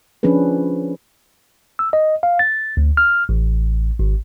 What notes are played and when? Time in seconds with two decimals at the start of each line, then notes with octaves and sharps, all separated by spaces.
0.23 F3 C#4 D4 G#4 B4
1.79 E6
1.93 D#5
2.23 F5
2.39 A6
2.77 D2
2.97 F6
3.29 A1
3.99 G#1